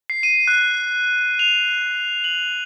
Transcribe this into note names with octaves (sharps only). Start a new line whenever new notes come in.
C7
D#7
F#6
F7
F#7